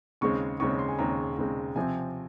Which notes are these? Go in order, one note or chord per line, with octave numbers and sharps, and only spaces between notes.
D#2 C#3 G#3 C4 C#6
D#2 C#3 G#3 C4 C#6
C6
G#5
D#2 C#3 G#3 C4 A#5
D#2 C#3 G#3 C4
C3 F3 C4 G#5